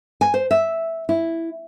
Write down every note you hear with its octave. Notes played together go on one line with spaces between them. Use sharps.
G#5
C5
E5
E4